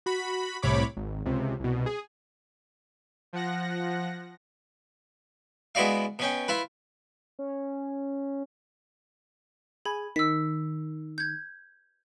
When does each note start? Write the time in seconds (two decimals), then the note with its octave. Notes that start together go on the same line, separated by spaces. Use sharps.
0.06 F#4 B5
0.62 C2 A2 C3 C#5 B5 D6
0.97 G#1
1.26 C#2 C3
1.60 C2 B2
1.86 G#4
3.33 F3 F#5 A#6
5.75 G#3 B3 E4 F#4 D5 F5
6.19 B2 C#4 G5
6.48 E4 F4 B4
7.39 C#4
9.85 G#4 G#5 B5
10.16 D#3 E6 B6
11.18 G6 G#6